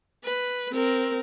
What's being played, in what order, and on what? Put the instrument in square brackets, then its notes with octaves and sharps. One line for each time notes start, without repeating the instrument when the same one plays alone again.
[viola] B4
C4 A#4